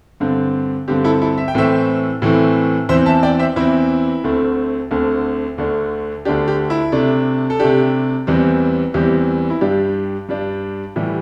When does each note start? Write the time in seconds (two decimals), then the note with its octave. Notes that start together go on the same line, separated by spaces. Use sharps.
0.20 G2 D3 C4
0.88 G2 D3 C4 G4
1.04 E4 A4
1.22 E4 A4
1.38 E5
1.48 G5
1.54 A2 E3 A3 C4 C5 E5
2.22 A2 E3 A3 C4
2.89 E2 E3 C4 C5 E5
3.06 E5 A5
3.23 D5 G5
3.40 C5 E5
3.56 E2 E3 C4 E4
4.24 D2 D3 A3 C4
4.91 D2 D3 A3 C4
5.58 D2 D3 A3 D4
6.25 D2 D3 A3 D4 G4
6.48 G4
6.70 E4
6.92 C3 A3 D4
7.50 A4
7.59 C3 A3 D4 G4
8.27 E2 E3 G3 C4
8.94 E2 E3 G3 C4 G4
9.50 E4
9.61 G2 G3 D4 G4
10.29 G2 G3 D4
10.96 A2 E3 G3 G4